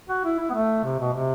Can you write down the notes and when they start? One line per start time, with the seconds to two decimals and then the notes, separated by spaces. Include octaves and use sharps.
0.09 F#4
0.24 E4
0.39 E4
0.49 B3
0.54 A3
0.84 C3
0.99 B2
1.14 C3